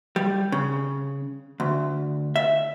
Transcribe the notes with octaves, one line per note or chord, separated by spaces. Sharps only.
G3
C#3
D2
E5